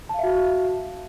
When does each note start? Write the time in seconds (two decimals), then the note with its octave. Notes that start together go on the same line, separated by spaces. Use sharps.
0.09 A5
0.14 F5
0.19 E5
0.23 F#4